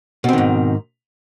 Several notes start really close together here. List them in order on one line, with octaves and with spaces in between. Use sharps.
B2 C4 D#3 G#2